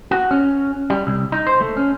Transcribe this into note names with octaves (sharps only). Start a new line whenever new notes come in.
F#4
C#4
G3
C2
D#4
C5
A3
C#4